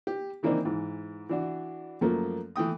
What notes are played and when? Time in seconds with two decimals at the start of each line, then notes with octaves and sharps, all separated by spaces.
0.07 G4
0.43 D#3 E3 A#3 C4 D4 D#4
0.65 G#2 E3
1.29 E3 D4 F#4
2.01 F#2 F3 A3 A#3
2.56 E3 A3 G5 D#6